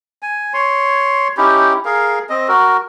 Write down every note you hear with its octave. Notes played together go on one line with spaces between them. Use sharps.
G#5
C#5 C6
C#4 D#4 E4 G4
G#4 A#4 F5
C4 D#5
F#4 A#4